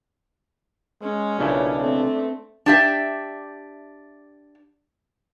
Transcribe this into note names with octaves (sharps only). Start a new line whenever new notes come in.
G#3 C#4
B1 A#2 C#3 D4 E4
A3 C4
D4 G4 E5